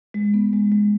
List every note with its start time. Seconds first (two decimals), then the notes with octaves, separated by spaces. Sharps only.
0.14 G#3
0.34 B3
0.53 G#3
0.72 G#3